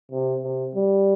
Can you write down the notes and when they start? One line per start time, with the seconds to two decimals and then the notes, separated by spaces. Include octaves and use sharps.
0.12 C3
0.43 C3
0.75 G3